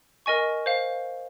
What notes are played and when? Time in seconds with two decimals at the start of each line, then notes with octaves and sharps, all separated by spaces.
0.26 A#4 D#5 G#5 C#6
0.66 C5 F5